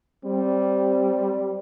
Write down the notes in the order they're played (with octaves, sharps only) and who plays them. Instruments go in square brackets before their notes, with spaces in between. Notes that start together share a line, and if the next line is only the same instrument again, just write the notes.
[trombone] G3 [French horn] C4